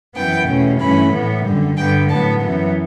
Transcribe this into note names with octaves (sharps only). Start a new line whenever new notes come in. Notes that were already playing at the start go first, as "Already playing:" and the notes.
F#2 E3 B3 G5
E2 B2 A3 C#4
G2 E3 A3 C#4 B5
A2 E3 B3
F#2 D3 G3
G2 D3 G3 B3 G5
A2 F#3 B3 A5
F#2 E3 B3